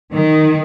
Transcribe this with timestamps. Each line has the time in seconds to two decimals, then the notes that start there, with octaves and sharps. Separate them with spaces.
0.15 D#3